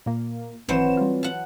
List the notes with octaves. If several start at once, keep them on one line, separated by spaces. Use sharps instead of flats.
A#2 A#3
G#1 E3 F#3 C4 C5 E7
G3 F4
F#5 A5